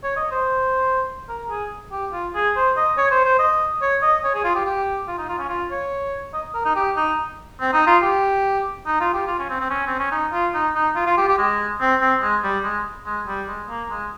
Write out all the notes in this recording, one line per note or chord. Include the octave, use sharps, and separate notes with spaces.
C#5
D#5
C5
A#4
G#4
G4
F4
G#4
C5
D#5
C#5
C5
C5
D#5
C#5
D#5
C#5
G#4
F4
G4
G4
F4
D#4
F4
C#4
F4
C#5
D#5
A#4
D#4
G4
D#4
C4
D#4
F4
G4
D#4
F4
G4
F4
C#4
C4
C4
C#4
C4
C#4
D#4
F4
D#4
D#4
F4
F4
G4
G4
G#3
C4
C4
G#3
G3
G#3
G#3
G3
G#3
A#3
G#3